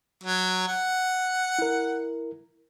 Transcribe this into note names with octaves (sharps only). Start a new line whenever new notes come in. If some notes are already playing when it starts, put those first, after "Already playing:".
F#3
F#5
E4 A#4